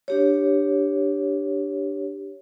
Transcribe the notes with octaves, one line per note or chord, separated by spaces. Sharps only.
D4 G4 C#5